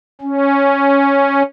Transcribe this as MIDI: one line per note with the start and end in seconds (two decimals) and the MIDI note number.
0.21 1.42 61